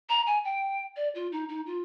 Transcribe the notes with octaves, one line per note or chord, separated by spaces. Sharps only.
A#5
G#5
G5
D5
F4
D#4
D#4
F4